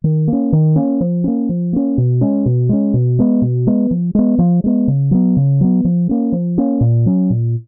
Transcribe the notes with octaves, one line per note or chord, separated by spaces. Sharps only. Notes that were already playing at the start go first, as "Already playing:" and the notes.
D#3
A#3
C#4
D#3
A#3 C#4
F3
A#3 C#4
F3
A#3 C#4
B2
G#3 C#4
B2
G#3 C#4
B2
G#3 B3
B2
G#3 B3
F3
G#3 B3
F3
G#3 B3
C#3
F#3 B3
C#3
F#3 B3
F3
A#3 C#4
F3
A#3 C#4
A#2
F#3 C#4
A#2